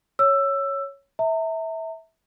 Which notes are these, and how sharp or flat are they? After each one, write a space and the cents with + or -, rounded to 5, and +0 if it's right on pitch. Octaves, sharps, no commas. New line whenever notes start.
C#5 +0 E6 +15
E5 -20 A#5 -40